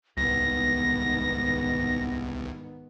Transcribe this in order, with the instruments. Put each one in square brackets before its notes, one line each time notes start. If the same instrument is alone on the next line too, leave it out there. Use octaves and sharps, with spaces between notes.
[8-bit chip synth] C2 [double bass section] G#2 D#3 B3 [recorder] A#6